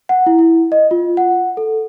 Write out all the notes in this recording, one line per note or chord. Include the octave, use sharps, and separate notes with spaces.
F#5
E4
E4
D#5
F4
F#5
A4